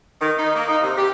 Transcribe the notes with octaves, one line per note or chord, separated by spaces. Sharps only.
D#3
D#4
A#3
D#4
C3
G4